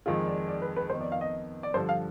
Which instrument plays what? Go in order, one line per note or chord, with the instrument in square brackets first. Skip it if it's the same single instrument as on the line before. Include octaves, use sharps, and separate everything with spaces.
[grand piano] F2 D#3 G#3 [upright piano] F4
[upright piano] D5
D5
B4
B4
[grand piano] F2 D#3 B3 D#4 [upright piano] C5
[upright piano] D5
F5
D#5
D5
[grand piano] G2 D3 F3 [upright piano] C5
[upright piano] F5